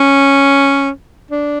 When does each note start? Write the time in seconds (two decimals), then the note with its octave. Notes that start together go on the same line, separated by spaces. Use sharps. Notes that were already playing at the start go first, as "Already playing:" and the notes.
Already playing: C#4
1.31 D4